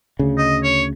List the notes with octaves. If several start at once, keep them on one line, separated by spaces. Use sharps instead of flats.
D2 C#3
D#5
C#5